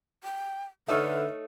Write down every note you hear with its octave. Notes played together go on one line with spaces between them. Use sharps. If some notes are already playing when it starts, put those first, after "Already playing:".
G5
D3 A3 D#4 B4 C#5 E5 E6 F6